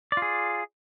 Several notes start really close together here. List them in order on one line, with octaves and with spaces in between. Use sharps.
D5 F4 G#4